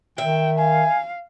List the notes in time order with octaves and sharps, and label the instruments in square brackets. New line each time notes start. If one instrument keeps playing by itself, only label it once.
[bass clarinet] D#3 [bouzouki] E5 [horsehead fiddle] G5
[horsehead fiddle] F5 [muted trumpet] G#5